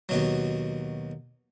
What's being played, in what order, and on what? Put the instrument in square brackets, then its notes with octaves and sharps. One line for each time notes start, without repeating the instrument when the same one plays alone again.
[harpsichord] D#2 B2 F#3